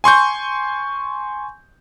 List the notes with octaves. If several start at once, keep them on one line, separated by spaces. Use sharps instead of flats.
G#5 C6 C#6 G6